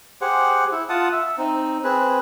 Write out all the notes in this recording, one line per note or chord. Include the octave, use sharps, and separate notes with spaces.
G4 G#4 C5 F#5
E4
F4 F#5 A5 D#6
E5
C4 D#4
C4 G#4 B4